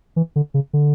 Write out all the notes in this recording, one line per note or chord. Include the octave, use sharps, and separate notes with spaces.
E3
D3
C#3
D3